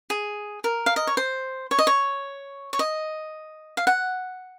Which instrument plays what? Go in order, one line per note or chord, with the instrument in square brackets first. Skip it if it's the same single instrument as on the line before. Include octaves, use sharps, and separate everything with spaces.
[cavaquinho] G#4
A#4
F5
D#5
C#5
C5
C#5
D#5
C#5
C#5
D#5
F5
F#5